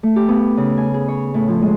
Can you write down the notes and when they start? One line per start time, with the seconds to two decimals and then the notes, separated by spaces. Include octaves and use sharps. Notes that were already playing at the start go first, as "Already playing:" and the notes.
0.03 A3
0.16 G4
0.29 B3
0.57 C#3
0.78 G#5
0.94 G#4
1.08 C#5
1.34 A2
1.48 F3
1.62 G#3